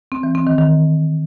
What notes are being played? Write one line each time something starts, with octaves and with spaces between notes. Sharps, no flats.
C4
E3
C4
D#3
D#3